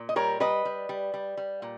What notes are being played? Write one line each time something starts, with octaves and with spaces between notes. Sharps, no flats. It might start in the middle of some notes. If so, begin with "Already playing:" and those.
Already playing: A#2
D#5
G3 A#4 C#5
G3 B4 D#5
G3
G3
G3
G3
A#2